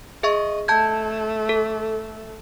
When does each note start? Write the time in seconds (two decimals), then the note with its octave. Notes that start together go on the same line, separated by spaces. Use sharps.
0.23 G#4 D#5 E5 C#6
0.68 A3 A5 G6 G#6
1.49 A4